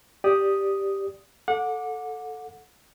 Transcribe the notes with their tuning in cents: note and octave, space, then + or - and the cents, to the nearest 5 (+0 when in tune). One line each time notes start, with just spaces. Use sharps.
G4 +0 D5 +0 D#6 +0
A4 +0 F#5 -30 D6 +0